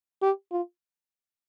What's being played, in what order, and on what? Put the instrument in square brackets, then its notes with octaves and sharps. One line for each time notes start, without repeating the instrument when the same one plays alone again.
[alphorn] G4
F4